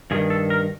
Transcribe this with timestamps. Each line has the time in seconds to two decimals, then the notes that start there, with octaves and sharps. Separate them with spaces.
0.11 G2 D#3 G#4
0.30 A4
0.50 A#4